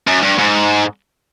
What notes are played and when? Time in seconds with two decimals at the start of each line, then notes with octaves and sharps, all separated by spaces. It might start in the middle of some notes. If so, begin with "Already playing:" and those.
0.08 F#2
0.23 G2
0.39 G#2